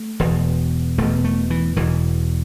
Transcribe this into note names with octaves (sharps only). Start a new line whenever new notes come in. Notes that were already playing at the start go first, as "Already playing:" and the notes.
Already playing: A3
E1 E2 B2
E1 E2 B2 A3
A3
E3
E1 E2 B2 E3